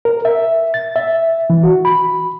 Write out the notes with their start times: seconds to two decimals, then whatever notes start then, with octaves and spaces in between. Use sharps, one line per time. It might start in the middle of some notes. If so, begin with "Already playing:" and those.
0.05 A#4
0.25 E5
0.74 A6
0.96 E5
1.50 E3
1.63 F#4
1.85 B5